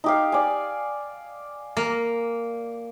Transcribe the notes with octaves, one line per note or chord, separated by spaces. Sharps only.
D#4 G4 F5
D5 G#5
A#3